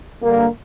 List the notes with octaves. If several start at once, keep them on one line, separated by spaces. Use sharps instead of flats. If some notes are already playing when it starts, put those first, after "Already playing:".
G2 D3 G3 A#3